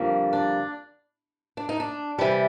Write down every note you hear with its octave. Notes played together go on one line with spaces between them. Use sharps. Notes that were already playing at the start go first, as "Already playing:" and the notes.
Already playing: F2 D3 G3 A#3
D4
D4
D#4
D4
C3 E3 G3